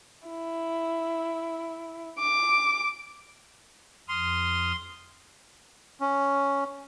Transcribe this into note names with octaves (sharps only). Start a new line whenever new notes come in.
E4
D6
F2 C6 D#6 F6
C#4